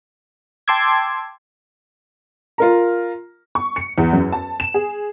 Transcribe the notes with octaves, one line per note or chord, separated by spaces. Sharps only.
G5 A5 C6 D6 E6 G#6
F4 A#4 A#5
C#6
C#7
E2
F#2
A5
E7
G#4